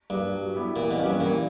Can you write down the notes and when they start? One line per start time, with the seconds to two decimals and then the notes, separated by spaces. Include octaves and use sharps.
0.10 G2 A#3 D4 G4
0.32 F#3
0.54 B3 E4 G4
0.76 A#2 E3
0.91 B2
0.98 A#3 C#4 G4
1.06 G2
1.20 A#2 E3